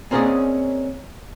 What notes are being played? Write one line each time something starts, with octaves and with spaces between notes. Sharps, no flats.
A#3 C4 C#4 G#4 D5 D#5